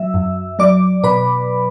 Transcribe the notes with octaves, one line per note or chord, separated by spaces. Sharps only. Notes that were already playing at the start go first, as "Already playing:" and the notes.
Already playing: F#3 E5 E6
F#2
F#3 D5 D6
B2 B4 B5